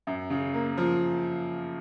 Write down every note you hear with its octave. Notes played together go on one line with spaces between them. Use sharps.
F#2
C#3
A#3
F3